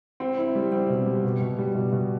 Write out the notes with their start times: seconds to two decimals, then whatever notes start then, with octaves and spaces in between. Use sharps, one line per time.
0.20 C4
0.37 E4
0.55 G3
0.72 C4
0.90 B2
1.06 G3
1.24 B2
1.41 B2
1.58 G3
1.75 B2
1.92 B2